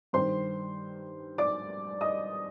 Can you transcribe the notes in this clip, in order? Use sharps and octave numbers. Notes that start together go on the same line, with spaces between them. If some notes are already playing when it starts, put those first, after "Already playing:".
G2 D#3 G3 C5 C6
D5 D6
D#5 D#6